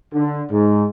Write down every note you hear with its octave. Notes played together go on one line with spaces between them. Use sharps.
D3
G#2